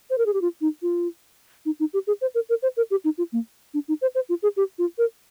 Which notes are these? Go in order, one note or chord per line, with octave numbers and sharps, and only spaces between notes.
C5
A#4
G#4
G4
F4
D#4
F4
D#4
D#4
G4
G#4
C5
A#4
A#4
C5
A#4
G4
D#4
F4
A#3
D4
D#4
C5
C5
F4
G#4
G4
F4
A#4